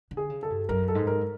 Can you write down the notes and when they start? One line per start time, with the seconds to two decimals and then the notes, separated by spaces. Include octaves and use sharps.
0.11 D3
0.17 G#4
0.30 C#3
0.43 A4
0.50 G2
0.69 F#2 A#4
0.88 A4
0.95 G#2
1.07 A#4